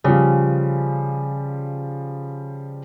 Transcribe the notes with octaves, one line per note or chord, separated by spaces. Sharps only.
C#3 F3 G3